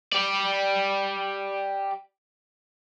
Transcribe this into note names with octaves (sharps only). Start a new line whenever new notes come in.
G4 D5